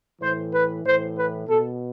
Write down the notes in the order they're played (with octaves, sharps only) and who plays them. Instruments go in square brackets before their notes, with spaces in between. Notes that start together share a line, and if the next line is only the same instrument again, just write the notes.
[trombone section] A2 E3 C5
B4
A2 E3 C5
B4
B2 A4